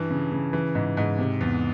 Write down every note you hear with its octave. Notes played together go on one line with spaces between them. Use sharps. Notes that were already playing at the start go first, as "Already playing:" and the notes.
Already playing: G2 E3
C#3
C#3
E3
G#2
G#2
C3
E2